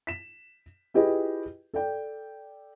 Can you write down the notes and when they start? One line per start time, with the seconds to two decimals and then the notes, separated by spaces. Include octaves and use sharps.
0.07 B6 E7
0.94 E4 F4 G4 G#4 B4 D#5
1.74 A4 D5 G5